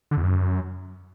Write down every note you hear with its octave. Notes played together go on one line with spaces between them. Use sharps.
D3
E2
F#2